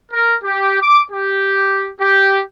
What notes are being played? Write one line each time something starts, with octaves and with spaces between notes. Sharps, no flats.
A#4
G4
D6
G4
G4